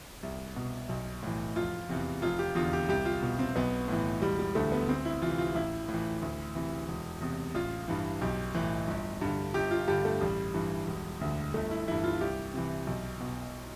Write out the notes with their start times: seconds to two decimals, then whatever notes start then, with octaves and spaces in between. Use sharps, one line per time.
0.23 C2
0.56 B2
0.89 B1
1.23 A2 E3
1.56 F1 F4
1.89 E2 C3 E3
2.22 F1 F4
2.39 G4
2.55 E2 D3 F4
2.73 G4
2.88 C2 G4
3.05 F4
3.22 B2
3.39 C4
3.56 B1 B3
3.88 A2 E3
4.22 E1 G3
4.39 G3
4.55 D2 D3 A3
4.72 B3
4.88 D2 C4
5.05 E4
5.22 C3 E3 F4
5.38 F4
5.55 A1 E4
5.89 A2 E3
6.22 D2
6.55 C3 E3
6.88 E1
7.21 E2 C3
7.54 A1 F4
7.88 G2 E3
8.21 B1 G4
8.55 A2 E3
8.88 G1
9.21 G2 D3
9.54 G1 G4
9.71 F4
9.88 G2 D3 G4
10.05 A3
10.21 A1 G3
10.54 G2 E3
10.87 E1
11.21 D2 D3
11.54 G1 A3
11.71 E4
11.87 G2 E3 E4
12.04 F4
12.21 C2 G4
12.54 C3 E3
12.87 B1
13.21 B2